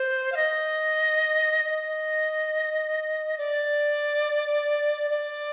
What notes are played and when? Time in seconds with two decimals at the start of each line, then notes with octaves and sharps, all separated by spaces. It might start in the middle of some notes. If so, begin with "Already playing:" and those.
Already playing: C5
0.32 F5
0.36 D#5
1.65 D#5
3.38 D5
5.10 D5